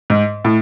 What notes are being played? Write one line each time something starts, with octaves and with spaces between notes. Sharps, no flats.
G#2
A2